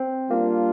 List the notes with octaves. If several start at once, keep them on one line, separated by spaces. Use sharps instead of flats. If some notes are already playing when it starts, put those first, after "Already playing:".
Already playing: C4
G3 A#3 D4 F4